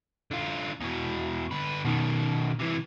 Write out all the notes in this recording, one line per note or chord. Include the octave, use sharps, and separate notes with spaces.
D3 F4
E2 B2
D3 B4
B2 D#3
C3 E3